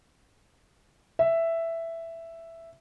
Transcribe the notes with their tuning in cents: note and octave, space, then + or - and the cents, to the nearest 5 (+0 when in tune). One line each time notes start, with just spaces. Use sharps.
E5 +5